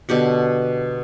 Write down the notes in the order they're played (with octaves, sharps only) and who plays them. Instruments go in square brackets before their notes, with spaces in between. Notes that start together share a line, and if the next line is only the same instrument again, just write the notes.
[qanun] B2 D3 G4 F#5